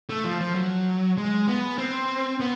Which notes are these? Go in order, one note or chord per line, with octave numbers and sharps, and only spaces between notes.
A3
F3
F3
F#3
G#3
B3
C4
B3